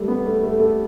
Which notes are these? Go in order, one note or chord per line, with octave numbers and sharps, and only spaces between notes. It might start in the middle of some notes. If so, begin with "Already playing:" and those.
Already playing: G3 A3
B3
A3
A3
A3